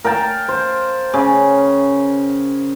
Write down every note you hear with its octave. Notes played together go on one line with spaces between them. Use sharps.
A#4 F5 G5 A5
C5
C#3